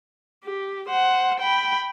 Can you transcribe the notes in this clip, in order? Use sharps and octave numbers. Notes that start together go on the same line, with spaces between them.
G4
C5 F#5
G5 B5